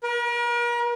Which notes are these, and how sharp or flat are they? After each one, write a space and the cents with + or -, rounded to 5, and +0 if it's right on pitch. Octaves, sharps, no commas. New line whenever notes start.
A#4 +40